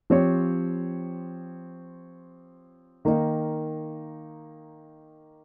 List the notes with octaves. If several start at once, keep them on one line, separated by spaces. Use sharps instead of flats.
F3 C4 G4 C#5
D#3 A#3 D#4